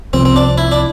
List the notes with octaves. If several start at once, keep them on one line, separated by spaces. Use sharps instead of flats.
C2 C3 F3 C4
C4
D4
E4
D4